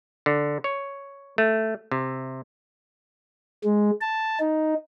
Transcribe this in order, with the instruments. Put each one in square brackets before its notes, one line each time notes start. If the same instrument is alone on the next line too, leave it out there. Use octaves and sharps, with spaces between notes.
[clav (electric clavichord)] D3
C#5
A3
C3
[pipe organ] G#3
A5
D#4